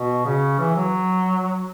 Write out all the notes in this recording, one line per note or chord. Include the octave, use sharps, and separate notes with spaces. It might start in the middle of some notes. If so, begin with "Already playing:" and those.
Already playing: B2
C#3
E3
F#3